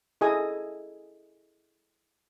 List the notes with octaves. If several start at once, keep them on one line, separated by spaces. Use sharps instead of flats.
E4 G#4 A4 D#5 G#5 D#6